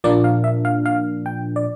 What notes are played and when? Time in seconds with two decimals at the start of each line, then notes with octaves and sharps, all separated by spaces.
0.04 A#2 F3 A#3 D4 D5
0.24 F5
0.44 E5
0.65 F5
0.86 F5
1.26 G5
1.56 D5